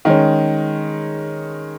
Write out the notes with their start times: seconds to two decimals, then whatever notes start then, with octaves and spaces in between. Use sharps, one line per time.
0.05 D#3 G#3 C#4